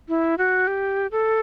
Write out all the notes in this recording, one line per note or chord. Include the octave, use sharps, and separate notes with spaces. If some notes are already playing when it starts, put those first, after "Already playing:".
E4
F#4
G4
A4